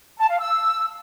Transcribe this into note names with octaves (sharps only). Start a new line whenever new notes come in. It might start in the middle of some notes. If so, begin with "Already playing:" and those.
A5
F5
E6